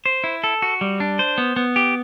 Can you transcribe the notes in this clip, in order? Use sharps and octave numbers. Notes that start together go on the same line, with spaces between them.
C5
E4
A4
F#4
G3
D4
C5
B3
B3
G4